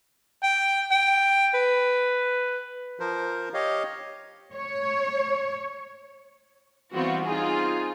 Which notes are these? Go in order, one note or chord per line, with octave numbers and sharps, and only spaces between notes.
G5
G5
B4
F3 A#4 C5
G4 C#5 D#5 F5
C#5
E3 G3 B3 C4 F4 F#4
C4 D#4 F4 G#4